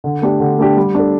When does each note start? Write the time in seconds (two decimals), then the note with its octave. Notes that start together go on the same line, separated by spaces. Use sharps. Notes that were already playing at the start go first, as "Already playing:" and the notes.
0.04 D3
0.22 A3 D4 G4
0.40 D3
0.59 A3 D4 G4
0.77 G3
0.95 D4 A4